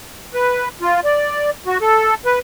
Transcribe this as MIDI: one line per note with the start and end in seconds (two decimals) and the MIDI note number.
0.34 0.68 71
0.81 1.00 65
1.04 1.50 74
1.66 1.78 66
1.81 2.15 69
2.25 2.39 71